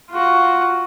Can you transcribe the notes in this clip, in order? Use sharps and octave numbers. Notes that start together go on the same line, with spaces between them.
F4 F#4